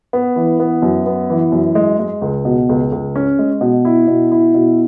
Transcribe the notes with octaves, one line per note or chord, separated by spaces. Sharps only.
B3
E3
B3
F#2
B3
E3
F#2
G#3
G#3
C#2
B2
C#2
C#2
C#4
G#3
B2
E4
B2
E4
B2